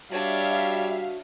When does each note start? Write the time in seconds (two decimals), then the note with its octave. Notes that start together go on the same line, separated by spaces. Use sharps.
0.11 G3 D4 F#4 C#5 E5 F5